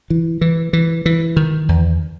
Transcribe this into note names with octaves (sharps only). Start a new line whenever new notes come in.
E3
E3
E3
E3
D#3
E2